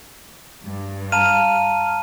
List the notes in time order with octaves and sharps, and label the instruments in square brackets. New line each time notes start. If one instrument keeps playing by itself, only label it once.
[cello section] G2
[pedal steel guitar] F5 [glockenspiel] A5 A#5 D#7